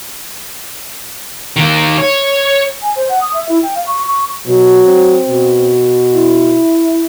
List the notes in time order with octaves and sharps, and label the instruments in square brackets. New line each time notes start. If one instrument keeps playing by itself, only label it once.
[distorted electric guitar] D#3 A#3
C#5
[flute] G#5
C5
F#5
D#6
E5
E4
G5
F5
C#6
C#6
[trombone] B2 [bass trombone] F#3
[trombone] C4
[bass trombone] B2
[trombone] E4